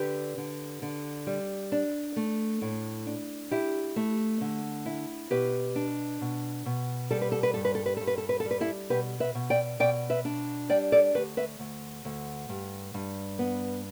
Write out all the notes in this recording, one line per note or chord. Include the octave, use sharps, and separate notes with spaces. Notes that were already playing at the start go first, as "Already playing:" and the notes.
Already playing: D3 G4 B4
D3
D3
G3
D4
A3
A2
D4
E4 G4
A3
D3
E4
B2 G4 B4
D4
B2
B2
G3 A4
B4
A4
B4
G2 A4
B4
A4
B4
G2 A4
B4
A4
B4
A4
G3
B4
E4 A4
B2 G4 B4
B4 E5
B2
D5 G5
B2 D5 G5
B4 E5
D4
G3 D5 G5
A4 D5
D2 G4 B4
B4 E5
D2
D2
G2
G2
B3